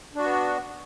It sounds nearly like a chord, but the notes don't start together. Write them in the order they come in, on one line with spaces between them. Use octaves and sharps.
D4 F#4 B3